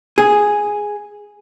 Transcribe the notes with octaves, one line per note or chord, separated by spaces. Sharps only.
G#4